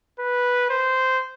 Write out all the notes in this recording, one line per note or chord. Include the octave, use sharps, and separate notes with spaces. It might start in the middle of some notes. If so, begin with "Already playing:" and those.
B4
C5